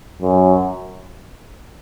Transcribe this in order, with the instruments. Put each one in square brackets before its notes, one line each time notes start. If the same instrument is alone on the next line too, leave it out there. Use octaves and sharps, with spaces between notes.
[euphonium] F#2